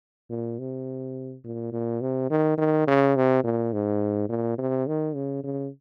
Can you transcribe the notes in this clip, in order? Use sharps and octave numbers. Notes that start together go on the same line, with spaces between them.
A#2
C3
A#2
A#2
C3
D#3
D#3
C#3
C3
A#2
G#2
A#2
C3
D#3
C#3
C#3